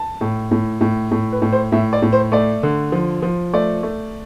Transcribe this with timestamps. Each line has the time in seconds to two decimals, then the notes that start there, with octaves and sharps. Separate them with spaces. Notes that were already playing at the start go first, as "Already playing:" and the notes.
Already playing: A5
0.21 A2
0.51 A2
0.81 A2
1.11 A2
1.32 B4
1.42 A2
1.53 C5
1.72 A2 E5
1.93 D5
2.02 A2
2.13 C5
2.32 A3 D5
2.63 D3
2.92 F3
3.22 F3
3.53 A3 D5
3.83 A3